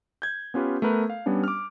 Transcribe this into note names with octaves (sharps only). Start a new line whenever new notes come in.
G6 G#6
B3 C#4 F4 G4 B4
A3 B3 A#4 B4
F5
G3 B3 C#4 D4
D6 F6